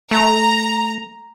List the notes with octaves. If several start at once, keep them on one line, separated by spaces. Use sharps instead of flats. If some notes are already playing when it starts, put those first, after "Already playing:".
A3 A#5